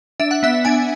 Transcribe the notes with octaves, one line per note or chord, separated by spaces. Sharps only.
D4 E5
F#5
B3 E5
D4 G#5